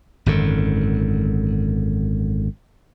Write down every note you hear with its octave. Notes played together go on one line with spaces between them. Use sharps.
G#1 F#2 D3